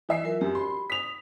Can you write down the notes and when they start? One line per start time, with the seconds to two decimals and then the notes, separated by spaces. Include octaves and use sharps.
0.09 E3 E5 C7
0.23 F#3 F4 A#4
0.41 F#2 G4
0.55 B5 C6
0.90 D#6 B6 F7